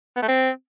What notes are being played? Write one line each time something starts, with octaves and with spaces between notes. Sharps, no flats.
B3
A3
C4